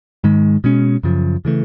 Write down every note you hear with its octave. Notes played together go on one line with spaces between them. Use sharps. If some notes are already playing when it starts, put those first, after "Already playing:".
G#2 D#3 G#3
B2 G#3 C#4
F#2 C#3 F3
C#3 E3 A3